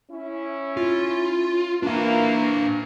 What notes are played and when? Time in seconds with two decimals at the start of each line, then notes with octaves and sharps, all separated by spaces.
0.11 C#4 E4
0.77 F4
1.83 E3 A#3 D4 F5